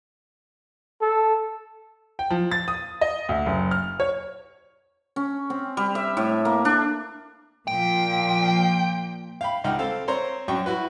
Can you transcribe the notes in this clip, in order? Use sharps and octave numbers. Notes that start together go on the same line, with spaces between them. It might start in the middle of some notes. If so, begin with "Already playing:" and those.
A4
G5
F3
A6
D#6
D#5
D2
F#1
F6
C#5
C#4
C4
G3
E5
A2
A#3
D4
A#2 F3 G5
F5 G5 B5
C#2 D#4 F#5 G5 F6
C4 A4 F5
C4 C5 C#5 A#5 C6
F#2 F#3 C#4 G5 C#6
E4 F#4 B4